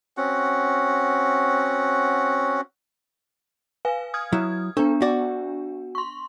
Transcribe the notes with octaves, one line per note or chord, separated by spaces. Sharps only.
C4 C#4 F#4 F#5
B4 F5 G#5
D#6 F6 G#6
F#3 E4
B3 D4 A4
F#4 D5
C6 C#6